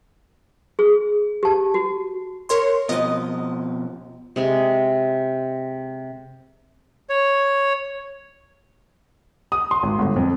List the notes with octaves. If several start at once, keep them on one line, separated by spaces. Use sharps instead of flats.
G#4
G4 A5
F#4
A#4 C#5 C6
B2 F3 C4 D#5 D#6
C3 G#3 C6
C#5
D#6
C6
G#1
G1
F2